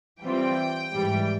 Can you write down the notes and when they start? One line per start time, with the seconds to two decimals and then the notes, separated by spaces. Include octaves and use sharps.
0.22 E3 G3 C4 F4 G5
0.92 G#2 E3 G3